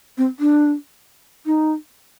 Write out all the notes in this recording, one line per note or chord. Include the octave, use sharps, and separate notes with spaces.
C4
D4
D#4